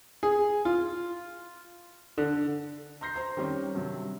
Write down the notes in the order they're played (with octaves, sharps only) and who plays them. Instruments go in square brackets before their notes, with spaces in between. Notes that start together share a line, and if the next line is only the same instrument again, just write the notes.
[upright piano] G#4
F4
D3
[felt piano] A#5 C6 G6 A#6 C7
C5 A#5 C6
D#3 G3 C4 C#4
G2 C3 F#3